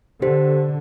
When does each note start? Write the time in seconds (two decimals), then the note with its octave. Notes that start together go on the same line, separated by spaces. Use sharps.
0.22 D3 G4 C5 B6